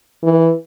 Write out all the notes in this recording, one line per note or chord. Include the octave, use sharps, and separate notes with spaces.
E3